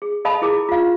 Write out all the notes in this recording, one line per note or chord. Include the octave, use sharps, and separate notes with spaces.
G#4
A4 D#5 F5 A5 B5 D#6
E4 G#4 A#4 D6
F4 F5